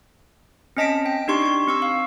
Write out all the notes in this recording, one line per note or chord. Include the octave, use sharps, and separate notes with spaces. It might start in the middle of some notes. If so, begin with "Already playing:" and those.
C4 C#4 D#5 A5 B6 D7
G5
D4 D#4 G4 C6 C#6
C6 C#6
C4 C#6 E6
F5